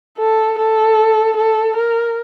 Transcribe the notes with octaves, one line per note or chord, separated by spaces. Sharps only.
A4
A4
A4
A#4